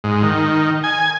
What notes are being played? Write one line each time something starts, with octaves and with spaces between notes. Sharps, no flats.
G#2
D#3
G#5